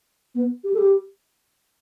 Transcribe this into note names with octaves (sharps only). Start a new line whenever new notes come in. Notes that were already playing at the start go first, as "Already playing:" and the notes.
B3
G4
A4
G4